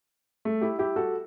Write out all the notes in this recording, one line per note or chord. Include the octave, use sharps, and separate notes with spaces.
A3
E4 G4
E4 G4
F#4 A4